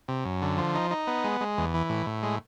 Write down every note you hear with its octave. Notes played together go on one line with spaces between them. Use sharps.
C3
F#2
D3
F3
D#4
D#4
B3
G#3
G#3
E2
E3
A2
A2
G#3